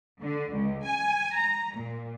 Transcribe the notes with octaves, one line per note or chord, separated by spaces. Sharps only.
D3
C#2
G#5
A#5
A#2